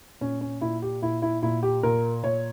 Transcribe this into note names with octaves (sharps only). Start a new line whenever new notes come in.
A#2 C#4
C#4
A#2 E4
G4
A#2 E4
E4
A#2 E4
G4
A#2 A#4
A#2 C#5